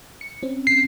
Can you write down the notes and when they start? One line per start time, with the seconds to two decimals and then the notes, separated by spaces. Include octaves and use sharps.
0.21 C#7
0.43 C4 C#4
0.67 C7